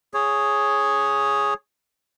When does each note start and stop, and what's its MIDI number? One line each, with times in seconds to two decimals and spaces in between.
0.14 1.54 68
0.14 1.54 73